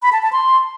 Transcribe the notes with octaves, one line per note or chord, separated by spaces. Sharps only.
B5
A5
A5
C6